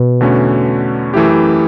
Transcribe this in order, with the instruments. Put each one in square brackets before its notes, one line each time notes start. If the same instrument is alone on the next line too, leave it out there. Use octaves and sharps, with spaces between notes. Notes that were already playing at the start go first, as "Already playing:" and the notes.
Already playing: [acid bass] B2
[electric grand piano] E2 D3 A3 C#4 F#4
F#2 E3 A3 E4 G4